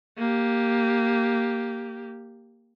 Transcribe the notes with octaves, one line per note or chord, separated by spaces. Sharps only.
A#3 G4